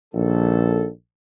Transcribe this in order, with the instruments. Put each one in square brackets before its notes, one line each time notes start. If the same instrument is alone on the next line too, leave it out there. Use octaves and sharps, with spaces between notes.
[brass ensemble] A#1 D#3 A4